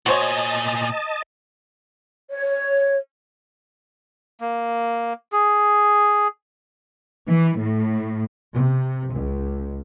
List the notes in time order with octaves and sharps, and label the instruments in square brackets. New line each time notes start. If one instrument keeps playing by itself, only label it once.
[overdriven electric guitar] A#2 G#5 [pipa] F#4 C5 C#5 [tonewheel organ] D#5 A5
[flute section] C#5
[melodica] A#3
G#4
[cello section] E3
A2
[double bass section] C3
C#2